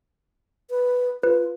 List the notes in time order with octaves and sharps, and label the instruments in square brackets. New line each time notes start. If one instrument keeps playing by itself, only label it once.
[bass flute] B4
[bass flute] F4 [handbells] B4